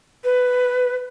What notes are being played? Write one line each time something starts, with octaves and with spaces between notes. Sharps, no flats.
B4